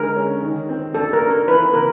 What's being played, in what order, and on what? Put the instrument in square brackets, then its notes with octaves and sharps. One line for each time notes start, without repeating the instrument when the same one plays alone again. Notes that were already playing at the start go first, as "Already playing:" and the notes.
Already playing: [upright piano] D3 G#3 [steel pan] A#4
[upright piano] C#4
D#3
C4
[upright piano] D4 [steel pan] A4
[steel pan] A#4
[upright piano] D4
[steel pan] A#4
[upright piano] E3 [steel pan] B4
[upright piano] C3 [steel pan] A#4